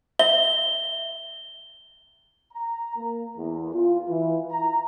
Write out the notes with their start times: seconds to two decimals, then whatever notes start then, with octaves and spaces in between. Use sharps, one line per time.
0.19 E5 G7
2.52 A#5
2.96 A#3
3.37 E2
3.74 F4
4.09 E3
4.52 A#5